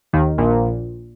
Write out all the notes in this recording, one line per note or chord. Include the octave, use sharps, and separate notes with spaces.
D#2 D#3
A#1 A#2